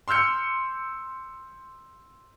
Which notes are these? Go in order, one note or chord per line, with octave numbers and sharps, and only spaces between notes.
C6 E6 F6 G6 C#7